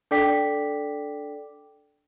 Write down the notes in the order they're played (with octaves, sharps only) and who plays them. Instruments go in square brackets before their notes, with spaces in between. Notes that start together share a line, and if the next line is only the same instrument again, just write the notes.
[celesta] D4 A4 D5 G5 D6 B6